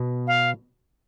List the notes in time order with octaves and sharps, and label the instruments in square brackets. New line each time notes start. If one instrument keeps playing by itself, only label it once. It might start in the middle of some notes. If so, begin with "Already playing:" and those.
Already playing: [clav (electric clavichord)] B2
[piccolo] F5